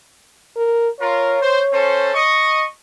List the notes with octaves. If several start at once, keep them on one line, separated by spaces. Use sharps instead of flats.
A#4
F4 A#4 C#5
C5
C#4 A4 C5
D#5 C#6